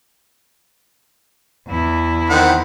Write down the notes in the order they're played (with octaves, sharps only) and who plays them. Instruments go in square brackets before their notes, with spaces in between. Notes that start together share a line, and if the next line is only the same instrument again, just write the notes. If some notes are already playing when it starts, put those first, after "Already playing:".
[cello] E2 E4
[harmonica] D#3 C4 F#5